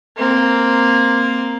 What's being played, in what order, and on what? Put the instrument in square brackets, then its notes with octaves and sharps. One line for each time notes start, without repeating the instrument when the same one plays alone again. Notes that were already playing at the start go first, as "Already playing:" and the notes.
[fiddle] A#3 C4